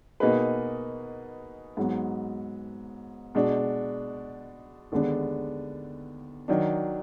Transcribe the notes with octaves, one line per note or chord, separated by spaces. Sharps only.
B2 A#3 D#4 G#4 B4
G#2 F#3 B3
B2 G#3 D4
D#2 D3 G#3 B3 D4
D#3 F#3 D4